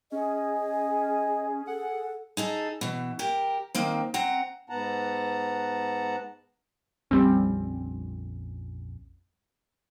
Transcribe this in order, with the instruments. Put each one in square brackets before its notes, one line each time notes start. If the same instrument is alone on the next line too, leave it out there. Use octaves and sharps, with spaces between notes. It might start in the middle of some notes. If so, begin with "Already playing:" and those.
[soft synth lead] C#4 [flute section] G#4 [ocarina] D#5
[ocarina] A4 [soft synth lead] F#5
[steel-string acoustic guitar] D#4 G#4 A4
B2 E3
G4 A#4
D#3 A#3 C4
C4 F#5 A#5
[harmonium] G#2 B3 F#5 A5 A#5
[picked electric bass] A#1 F2 C#4 [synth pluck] G3 C4